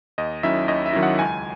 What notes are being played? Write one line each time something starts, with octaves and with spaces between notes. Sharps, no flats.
D#2 D#5
D#3 F#3 C#4 E4 E5
D#2 D#5
E5
D#3 F#3 C#4 E4
F#5
C#2 G#5